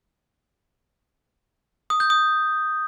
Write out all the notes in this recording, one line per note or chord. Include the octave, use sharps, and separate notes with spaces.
D#6
G6
D#6